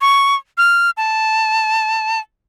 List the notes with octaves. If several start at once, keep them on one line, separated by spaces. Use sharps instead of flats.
C#6
F6
A5